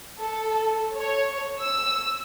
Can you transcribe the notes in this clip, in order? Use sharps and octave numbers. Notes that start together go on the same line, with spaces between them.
A4
C#5
E6